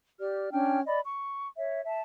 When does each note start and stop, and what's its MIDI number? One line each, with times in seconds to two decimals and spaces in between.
0.19 0.49 67
0.19 0.49 74
0.19 0.49 89
0.52 0.80 61
0.52 0.80 62
0.52 0.80 79
0.52 0.80 89
0.86 1.00 74
0.86 1.00 75
0.86 1.00 83
1.04 1.47 85
1.58 1.81 73
1.58 1.81 76
1.85 2.02 76
1.85 2.02 81